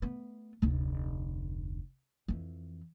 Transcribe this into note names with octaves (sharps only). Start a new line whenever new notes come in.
A3 B3
F1 D2
F2 E3